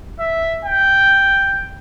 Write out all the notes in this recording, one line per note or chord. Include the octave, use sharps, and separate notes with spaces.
E5
G5